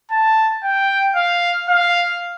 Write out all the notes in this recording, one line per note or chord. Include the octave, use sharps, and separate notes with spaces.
A5
G5
F5
F5